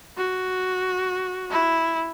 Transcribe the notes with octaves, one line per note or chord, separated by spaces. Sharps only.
F#4
E4